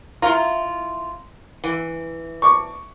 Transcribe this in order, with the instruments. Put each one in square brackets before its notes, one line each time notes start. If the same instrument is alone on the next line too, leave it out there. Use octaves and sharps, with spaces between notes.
[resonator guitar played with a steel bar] E4 F4 [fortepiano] A#5
[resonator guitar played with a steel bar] E3
[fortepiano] C#6 D6